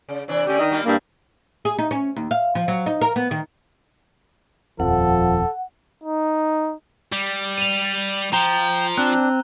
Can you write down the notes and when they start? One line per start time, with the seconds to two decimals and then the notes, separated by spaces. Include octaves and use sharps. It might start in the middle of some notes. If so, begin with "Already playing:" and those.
0.09 C#3
0.28 C3 E3 D4
0.47 D3 A3 C#4 G4
0.59 D#3 D#5
0.72 G3 A#3 F#4
0.84 G2 A#3 E4
1.65 G#4
1.79 D#4
1.91 C#4
2.16 D#2
2.31 F5
2.55 F3
2.68 F#3
2.86 D#4
3.01 A#4
3.16 B3
3.31 D#3
4.80 D#1 F2 F3 A4 F#5
6.03 D#4
7.13 G3
7.58 D#7 F7
8.33 F3 G5 A#5 G7
8.98 C4 D4 F#6